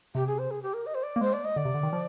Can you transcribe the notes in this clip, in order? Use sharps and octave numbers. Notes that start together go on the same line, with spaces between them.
C3 G4
G#4
C5
G#4
G4
A#4
D#5
C5
D5
A#3
G#3 C5
D5
D#5
D3 D5
C3
D3
D#3
F3